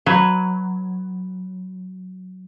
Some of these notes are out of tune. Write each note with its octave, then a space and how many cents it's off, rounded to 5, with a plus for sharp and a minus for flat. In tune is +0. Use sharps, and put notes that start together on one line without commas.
F#3 +0 B4 +0